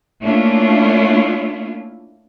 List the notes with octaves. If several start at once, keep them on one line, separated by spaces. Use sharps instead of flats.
A3 A#3 C#4 D4 E4 F4